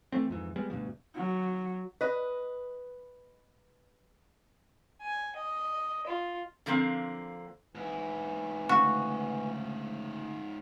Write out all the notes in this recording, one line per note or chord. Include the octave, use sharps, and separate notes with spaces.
E3 G3 A3 C4
F2 G#2 E3
G3 G#3 B3
D2 G2 B2 F3
F#3
B4 D#5
G#5
D#5
F4
D3 F3 A#3 C4
G#2 E3 E4
D2 A#2 C#3 F#4